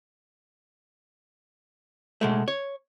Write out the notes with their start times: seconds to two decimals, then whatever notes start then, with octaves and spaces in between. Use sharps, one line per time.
2.21 B2 G#3 A3
2.48 C#5